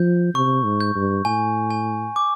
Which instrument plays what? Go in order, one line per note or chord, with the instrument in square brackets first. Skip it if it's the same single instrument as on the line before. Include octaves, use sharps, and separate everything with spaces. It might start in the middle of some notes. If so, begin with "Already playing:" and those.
Already playing: [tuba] F3 [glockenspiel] G6
[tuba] C3 [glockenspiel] C#6
[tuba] G#2
[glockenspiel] G6
[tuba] G2
[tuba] A2 [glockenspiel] G#5
[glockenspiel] G#5
D6